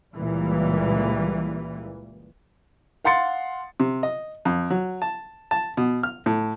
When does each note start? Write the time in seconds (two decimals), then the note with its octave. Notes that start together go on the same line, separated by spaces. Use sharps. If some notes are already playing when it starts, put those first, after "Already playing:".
0.14 C#2 A#2 E3 G3
3.05 F5 F#5 C6 A6 C#7
3.80 C3
4.03 D#5
4.45 F2
4.70 F#3
5.02 A5
5.51 A5
5.77 B2
6.03 F6
6.26 A2